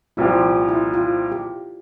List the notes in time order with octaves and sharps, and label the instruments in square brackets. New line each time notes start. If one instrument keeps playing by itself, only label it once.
[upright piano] C2 A#2 F3 C4 G4 [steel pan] E4
[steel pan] F4
E4
F4
G4